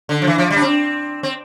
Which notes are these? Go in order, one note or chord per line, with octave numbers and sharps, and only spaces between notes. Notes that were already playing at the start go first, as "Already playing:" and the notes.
D3
F3
E3
F3
G3
D4
C4
C4